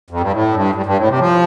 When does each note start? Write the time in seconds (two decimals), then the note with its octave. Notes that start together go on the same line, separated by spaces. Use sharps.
0.10 F2
0.20 G2
0.32 A2
0.54 G2
0.75 G2
0.86 G2
0.97 A2
1.08 C3
1.19 F3